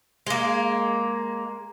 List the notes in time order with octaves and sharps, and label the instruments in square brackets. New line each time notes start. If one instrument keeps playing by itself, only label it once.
[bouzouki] G#3 A#3